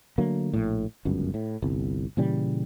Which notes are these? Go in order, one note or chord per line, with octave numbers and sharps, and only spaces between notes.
D3 F#3 A3 A#3
A#1 A2
G1 C#2 F#2
A2
G1 C2
A#2 C#3 E3 G3